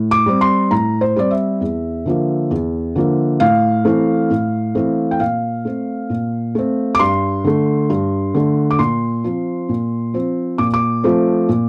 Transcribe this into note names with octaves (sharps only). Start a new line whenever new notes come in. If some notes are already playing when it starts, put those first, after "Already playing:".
Already playing: A2
D6
G3 C4
C6
A2 A#5
C5
G3 C4 D5
E5
E2
D3 F3 A#3
E2
D3 F3 A#3
A2 F5
E3 A3 C4
A2
E3 A3 C4
G5
A#2 F5
A3 C4
A#2
A3 C4
D6
G2 C6
D3 A3
G2
D3 A3
D6
A#2 C6
F3 C4
A#2
F3 C4
A#2 D6
D6
F3 A3 C4
A#2